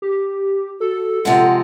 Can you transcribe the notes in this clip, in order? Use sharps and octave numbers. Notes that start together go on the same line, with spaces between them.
G4
F#4 A4
C3 F3 G#3 F#5